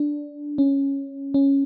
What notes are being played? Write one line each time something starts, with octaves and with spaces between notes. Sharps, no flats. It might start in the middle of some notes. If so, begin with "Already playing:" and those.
Already playing: D4
C#4
C#4